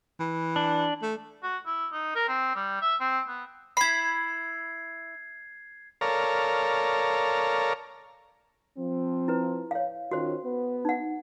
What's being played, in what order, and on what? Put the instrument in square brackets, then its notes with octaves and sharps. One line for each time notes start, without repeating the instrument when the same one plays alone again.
[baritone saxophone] E3
[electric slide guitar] D4
[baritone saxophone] A3
[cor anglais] F#4
E4
D#4
A#4
C4
G3
E5
C4
B3
[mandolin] E4 B5 [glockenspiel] G#6 C7
[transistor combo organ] A4 A#4 C#5 D5 F5 A#5
[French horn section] F3 C4
[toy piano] E4 B4
C#5 F5
[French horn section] D#3 C#4 F4 [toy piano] F#4 C5
[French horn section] B3 B4
[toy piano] D#4 F#5